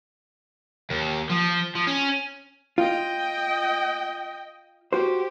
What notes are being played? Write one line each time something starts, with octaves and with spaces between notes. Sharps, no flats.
D#2
F3
F3
C#4
F4 D#5 G5
F#4 G4 C5